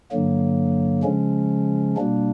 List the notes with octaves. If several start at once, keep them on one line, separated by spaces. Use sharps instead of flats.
G2 D3 F#3 A#3
C#3 F3 G#3 C#4
B2 G3 A#3 D4